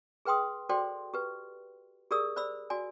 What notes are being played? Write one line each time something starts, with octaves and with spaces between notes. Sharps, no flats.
G#4 B4 G5 C6 D#6
F#4 A4 C5 D5 G5 C6
G4 B4
G4 G#4 A#4 D5 D#6 E6
C5 D5 B5 E6
F#4 D5 G#5